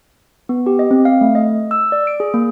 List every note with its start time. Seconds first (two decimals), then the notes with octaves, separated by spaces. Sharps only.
0.49 B3
0.66 G4
0.79 D#5
0.91 C4
1.05 F5
1.21 A3
1.35 D#5
1.71 E6
1.92 D5
2.07 D7
2.20 G#4
2.34 A#3